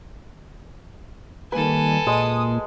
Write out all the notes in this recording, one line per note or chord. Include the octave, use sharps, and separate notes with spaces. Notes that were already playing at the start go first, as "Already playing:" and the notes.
D#3 G3 A#3 A4 B4 G#5
A#2 G#3 D#6